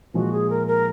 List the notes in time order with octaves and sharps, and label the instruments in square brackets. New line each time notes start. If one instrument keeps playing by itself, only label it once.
[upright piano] A#2 F3 G#3 D#4 [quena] F#4
[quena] G#4
A#4
A#4